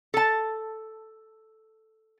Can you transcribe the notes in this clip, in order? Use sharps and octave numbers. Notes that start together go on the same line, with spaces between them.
A4 A5